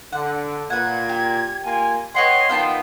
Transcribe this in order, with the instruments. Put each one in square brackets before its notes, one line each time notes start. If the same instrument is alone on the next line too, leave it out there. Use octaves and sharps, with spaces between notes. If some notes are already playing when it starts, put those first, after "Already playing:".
[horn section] D3 [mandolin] F#5
[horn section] A#2 [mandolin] B4 F#5 [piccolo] G#6
[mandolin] G4
[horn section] A#3 F4 G#5
[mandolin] B4 F#5 G5 [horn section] C#5 D#5 [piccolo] C6
[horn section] D#3 F3 B3 [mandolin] F5 G5 A5